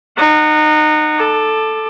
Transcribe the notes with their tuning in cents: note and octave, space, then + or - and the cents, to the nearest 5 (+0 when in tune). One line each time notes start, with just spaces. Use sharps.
D#4 -25 F#5 +0
A4 +0 D6 +20